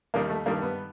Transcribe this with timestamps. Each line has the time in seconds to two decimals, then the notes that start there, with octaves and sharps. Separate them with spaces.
0.14 D#2 D#3 G3 A#3
0.30 A3
0.46 G2 D#3 G3 A#3
0.62 B3